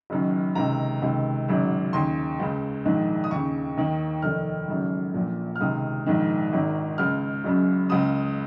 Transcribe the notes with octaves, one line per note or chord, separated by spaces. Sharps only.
F#1 F#2 D#3
C#2 C3 D#3 A#5
C#2 C3 D#3
G#1 F#2 C#3
D#2 C#3 C6
C#2 C#3
A#1 G#2 D#3
D#6
D#2 C#3 C#6
D#2 D#3
F1 D#2 D#3 F6
G#1 F#2 C#3
A#1 A#2
F6
C#2 C3 D#3 D#6
A#1 G#2 D#3
G#1 G#2 D#3
C#2 C#3 F6
F#1 F#2 C#3
C#2 C#3 D#6